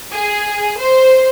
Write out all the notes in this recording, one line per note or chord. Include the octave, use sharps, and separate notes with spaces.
G#4
C5